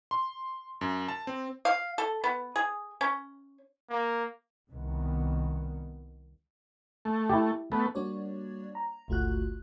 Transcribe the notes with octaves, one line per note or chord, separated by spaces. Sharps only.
C6
F#2
A5
C4
F5
A4
B3
G#4
C#4
A#3
C2 D#3 B3
A3
E4 G4
A3 B3
G3 A#3 D4 F#4 C#5 D5
A#5
G1 C#2 A3 F4 F#4 F#6